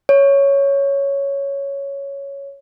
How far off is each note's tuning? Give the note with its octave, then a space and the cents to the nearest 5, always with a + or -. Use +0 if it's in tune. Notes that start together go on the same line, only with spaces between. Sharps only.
C#5 +5